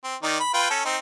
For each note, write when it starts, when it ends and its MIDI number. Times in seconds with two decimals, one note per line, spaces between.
0.04 0.16 60
0.23 0.38 51
0.23 0.38 63
0.23 0.38 74
0.40 0.51 83
0.54 0.69 65
0.54 0.69 71
0.54 0.69 79
0.70 0.80 61
0.70 0.80 69
0.85 0.97 60
0.85 0.97 63